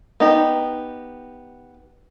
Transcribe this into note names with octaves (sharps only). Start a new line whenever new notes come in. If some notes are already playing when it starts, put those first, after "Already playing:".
B3 D#4 G4